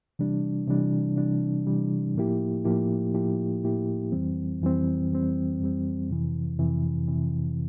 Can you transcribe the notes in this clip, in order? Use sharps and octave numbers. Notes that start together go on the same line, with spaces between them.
C3 E3 G3 D4
C3 E3 G3 D4
C3 E3 G3 D4
C3 E3 G3 D4
A2 F3 A#3 E4 G4
A2 F3 A#3 E4 G4
A2 F3 A#3 E4 G4
A2 F3 A#3 E4 G4
F2 E3 G3 C4
F2 E3 G3 C4
F2 E3 G3 C4
F2 E3 G3 C4
F2 C3 E3
F2 C3 E3
F2 C3 E3